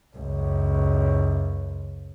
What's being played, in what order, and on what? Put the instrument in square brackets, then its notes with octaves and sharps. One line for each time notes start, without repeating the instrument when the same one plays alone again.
[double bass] C#2 F#2